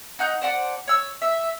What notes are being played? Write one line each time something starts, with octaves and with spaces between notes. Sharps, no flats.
D#4 F#5 G6
C5 D5 F#5 A5
C#5 E6
E5